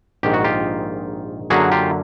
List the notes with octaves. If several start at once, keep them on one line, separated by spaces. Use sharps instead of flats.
A#1 G#2 D#3 G4
F#4
F4 G4
F#2 D3 F#3 A#3 C#4 F#4 G#4
F4 G4